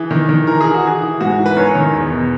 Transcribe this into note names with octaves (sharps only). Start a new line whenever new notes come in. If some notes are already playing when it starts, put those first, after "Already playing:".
Already playing: E3 G#4
D#3
D#3
E3 A#4
G#4
E3
F#4
E3 G#4
E3
G#2 F#4
E3
B4
F#2 A#4 C#5
D#3
E2
B2